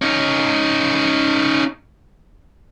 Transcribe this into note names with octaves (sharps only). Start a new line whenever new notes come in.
C#4 D#4